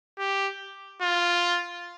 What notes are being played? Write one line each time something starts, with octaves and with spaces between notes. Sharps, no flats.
G4
F4